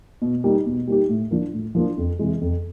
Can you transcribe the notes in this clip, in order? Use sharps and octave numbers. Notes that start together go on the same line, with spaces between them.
B2
G3 A#3 D#4 G4
B2
G3 A#3 D#4 G4
A2
F3 A#3 D4 F4
A2
F3 A#3 D4 F4
F2
C3 E3 G#3
F2